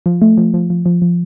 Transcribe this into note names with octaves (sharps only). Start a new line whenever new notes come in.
F3
A3
F3
F3
F3
F3
F3